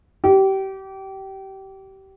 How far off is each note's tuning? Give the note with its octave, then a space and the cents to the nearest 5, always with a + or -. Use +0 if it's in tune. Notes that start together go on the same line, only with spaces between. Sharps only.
G4 -25